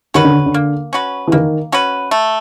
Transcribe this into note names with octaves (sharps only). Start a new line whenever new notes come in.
D#3 C#4 F#4 B4
D3
D3
A#3
C#4 F#4 B4
E3
D#3 A#3
C#4 F#4 B4
A3